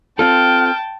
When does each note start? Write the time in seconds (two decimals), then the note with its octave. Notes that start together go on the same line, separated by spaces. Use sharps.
0.19 C4 F4 A4 G5 A5 F6